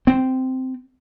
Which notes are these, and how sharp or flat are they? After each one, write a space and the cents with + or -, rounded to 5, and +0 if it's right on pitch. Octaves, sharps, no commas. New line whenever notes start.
C4 -10